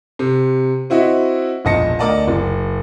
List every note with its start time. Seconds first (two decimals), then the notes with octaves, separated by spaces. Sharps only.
0.19 C3
0.90 C4 E4 F#4 D#5 E5
1.65 E1 A#1 D#5 A5 A#6 C#7
1.99 D2 A#4 D5 D#5 A5
2.28 F#1